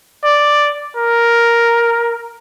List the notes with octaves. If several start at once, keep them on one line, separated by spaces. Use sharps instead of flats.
D5
A#4